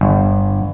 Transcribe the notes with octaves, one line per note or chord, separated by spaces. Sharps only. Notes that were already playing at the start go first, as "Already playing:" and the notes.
G1